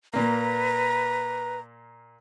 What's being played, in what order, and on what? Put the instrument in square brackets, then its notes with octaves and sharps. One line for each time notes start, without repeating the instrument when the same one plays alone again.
[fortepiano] A#2 A#3 [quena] B4 [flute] A#5